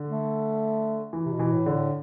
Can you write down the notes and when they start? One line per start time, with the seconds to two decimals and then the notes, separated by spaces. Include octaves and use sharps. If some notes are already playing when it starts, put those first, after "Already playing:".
Already playing: D3
0.09 A3
1.13 E3
1.26 C3
1.33 B2
1.39 E3
1.52 A2
1.66 D3
1.73 A2